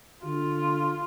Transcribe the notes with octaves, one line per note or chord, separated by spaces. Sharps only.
D3 F4